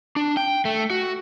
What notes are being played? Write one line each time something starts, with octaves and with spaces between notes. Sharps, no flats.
D4
G5
A3
F#4